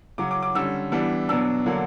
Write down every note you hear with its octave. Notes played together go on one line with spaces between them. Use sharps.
C#3 F#3 C#4 D6
D6
D6
D3 G3 C#4 E6
E3 G3 B3 D4
B2 F#3 B3 D4 E6
D3 F#3 A#3 D4